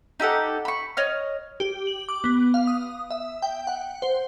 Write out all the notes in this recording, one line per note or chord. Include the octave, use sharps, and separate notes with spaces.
D#4 G4 A4 F#5
B5 C#6
C#5 D#5 F6
G4
F#7
D6
B3
F5
D#6
E5
G5
F#5
C5